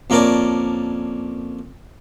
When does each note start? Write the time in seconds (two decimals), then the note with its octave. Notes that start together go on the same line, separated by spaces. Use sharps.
0.10 F2 A#3 C#4 A#4 D5 A5